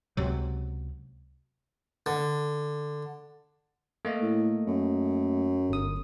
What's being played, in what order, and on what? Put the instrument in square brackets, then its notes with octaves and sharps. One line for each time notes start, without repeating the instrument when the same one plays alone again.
[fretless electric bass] C#2 C3 F#3
[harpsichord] D3
[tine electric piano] A3 A#3 D#5
[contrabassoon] A2
F#2
[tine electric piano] G1 D#6